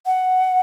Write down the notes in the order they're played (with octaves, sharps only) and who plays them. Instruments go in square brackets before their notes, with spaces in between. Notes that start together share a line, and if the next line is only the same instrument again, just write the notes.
[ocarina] F#5